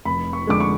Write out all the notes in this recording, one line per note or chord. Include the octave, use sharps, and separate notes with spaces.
F1 B5
C#6
F2 D3 G#3 D6
C#6